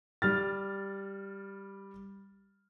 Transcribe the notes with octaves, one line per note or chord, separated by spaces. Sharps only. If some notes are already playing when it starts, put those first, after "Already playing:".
G3 F6 A6